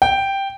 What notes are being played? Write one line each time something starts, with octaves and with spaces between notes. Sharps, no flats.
G5